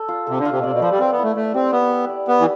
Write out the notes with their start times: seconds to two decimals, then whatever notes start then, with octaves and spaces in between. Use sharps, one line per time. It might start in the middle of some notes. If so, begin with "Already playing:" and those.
Already playing: A4
0.08 F4
0.27 C3 A4
0.39 D3
0.45 F4
0.51 C3
0.59 B2
0.63 C3 D5
0.72 B2
0.81 F3 B4
0.91 G3
1.00 C4 B4
1.12 B3
1.18 E4
1.24 A3
1.36 A3 D5
1.54 C4 G4
1.72 B3 E5
1.90 B4
2.09 D5
2.27 B3 G4
2.40 E3